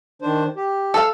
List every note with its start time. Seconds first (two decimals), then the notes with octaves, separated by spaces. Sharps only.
0.22 D#3 D4 C5
0.56 G4
0.94 A4 F5